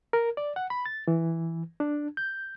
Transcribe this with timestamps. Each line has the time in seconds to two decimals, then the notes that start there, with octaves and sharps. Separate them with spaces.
0.13 A#4
0.37 D5
0.56 F#5
0.70 B5
0.86 A6
1.07 E3
1.80 D4
2.17 G6